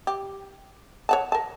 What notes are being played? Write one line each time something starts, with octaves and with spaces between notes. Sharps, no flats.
G4
C#5 F#5 A5
A#4 A5